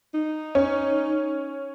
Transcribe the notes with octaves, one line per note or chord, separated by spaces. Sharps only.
D#4
C#4